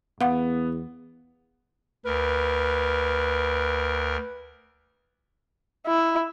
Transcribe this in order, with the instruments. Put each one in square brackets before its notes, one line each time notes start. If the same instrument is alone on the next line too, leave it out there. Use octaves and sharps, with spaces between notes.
[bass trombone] E2 [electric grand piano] B3 [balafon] F5 F#5
[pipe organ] D2 A#4 [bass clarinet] B4
[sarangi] E4